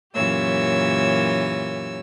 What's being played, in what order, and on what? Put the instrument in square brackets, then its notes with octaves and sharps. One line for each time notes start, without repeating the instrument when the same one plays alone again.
[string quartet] F#2 A#2 E3 G4 C#5 E6